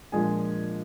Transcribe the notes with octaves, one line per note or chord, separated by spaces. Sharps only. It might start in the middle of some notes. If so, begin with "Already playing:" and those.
A#2 F3 G#3 D4 G#4 G#5